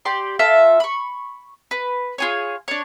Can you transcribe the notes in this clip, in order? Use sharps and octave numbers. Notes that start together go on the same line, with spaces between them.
G4 D5 C6
F4 A4 E5 A5
B5 C#6
B4
F4 G#4 C#5
D4 C#5